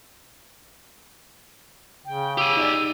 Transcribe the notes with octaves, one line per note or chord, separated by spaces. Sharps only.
C#3 G5
G4 G#5 E6
D#4 D5